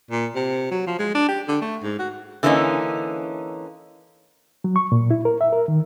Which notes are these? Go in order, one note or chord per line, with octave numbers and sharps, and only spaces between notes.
A#2
C3
F#3
F3
G#3
D4
G4
D3
A3
G#2
F#4
D3 E3 A#3 B3 C#4 D#4
F#3
C#6
A#2
E4
A#4
E5
A#4
D#3